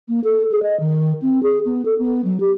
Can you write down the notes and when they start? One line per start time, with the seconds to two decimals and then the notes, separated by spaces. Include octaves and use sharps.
0.08 A#3
0.24 A4
0.51 G#4
0.63 D#5
0.80 D#3
1.22 C4
1.43 G#4
1.65 B3
1.85 A4
1.99 B3
2.25 F#3
2.40 G4